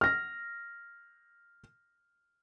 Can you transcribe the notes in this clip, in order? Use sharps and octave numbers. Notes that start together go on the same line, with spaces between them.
F6 A#6